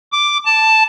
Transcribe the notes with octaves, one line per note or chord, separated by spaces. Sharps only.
D6
A5